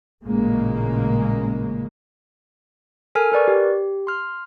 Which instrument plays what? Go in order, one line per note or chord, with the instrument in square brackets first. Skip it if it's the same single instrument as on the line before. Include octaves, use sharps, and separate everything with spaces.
[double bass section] A1 A#2 C#3 G#3 A#3
[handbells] A4 A#4 G#5 F6
A#4 B4 D5 C#6
G4
C6 F6